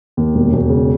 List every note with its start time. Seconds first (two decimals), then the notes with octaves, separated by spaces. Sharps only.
0.17 D#2
0.35 E1
0.52 E1
0.69 C#3